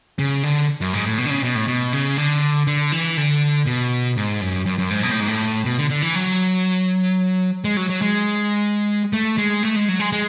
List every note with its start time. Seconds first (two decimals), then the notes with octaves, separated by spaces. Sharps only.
0.19 C#3
0.43 D3
0.81 F#2
0.93 G#2
1.06 A2
1.18 B2
1.26 D3
1.30 C#3
1.43 B2
1.55 A2
1.68 B2
1.93 C#3
2.17 D3
2.67 D3
2.92 E3
3.17 D3
3.66 B2
4.17 G#2
4.41 F#2
4.66 F#2
4.78 F#2
4.91 G#2
5.03 B2
5.11 A2
5.20 G#2
5.28 A2
5.65 B2
5.78 D3
5.90 D3
6.02 E3
6.15 F#3
7.64 G#3
7.77 F#3
7.89 F#3
8.02 G#3
9.13 A3
9.38 G#3
9.63 A3
9.76 G#3
9.88 F#3
10.00 G#3
10.12 G#3